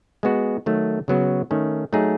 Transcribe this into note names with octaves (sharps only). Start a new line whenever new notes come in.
G#3 B3 F#4
D#3 F#3 A3
C#3 F#3 B3 F#4
D#3 A3 C#4
F#3 A3 D#4 G#4